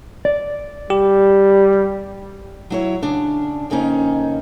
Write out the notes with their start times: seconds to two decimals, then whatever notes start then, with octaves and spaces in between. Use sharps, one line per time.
0.25 D5
0.90 G3 G4
2.70 F#3 E4 C#5
3.02 C#3 D4
3.70 F2 C#3 A#3 C#4 D#4